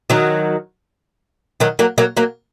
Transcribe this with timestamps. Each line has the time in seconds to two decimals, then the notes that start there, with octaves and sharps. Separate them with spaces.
0.10 D#3 F#3
1.60 D#3 F#3
1.79 F#3 A#3
1.98 F#3 A#3
2.17 F#3 A#3